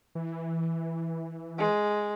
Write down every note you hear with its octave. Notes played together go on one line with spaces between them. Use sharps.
E3
G#3